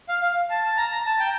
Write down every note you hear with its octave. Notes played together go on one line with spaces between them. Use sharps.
F5
F5
A5
A5
A#5
A#5
A5
G5